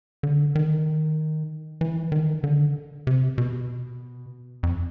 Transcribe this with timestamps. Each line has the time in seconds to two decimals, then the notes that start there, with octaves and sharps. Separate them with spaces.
0.23 D3
0.55 D#3
1.81 E3
2.12 D#3
2.44 D3
3.07 C3
3.38 B2
4.63 F2